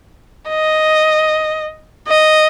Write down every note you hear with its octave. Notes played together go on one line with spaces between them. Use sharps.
D#5
D#5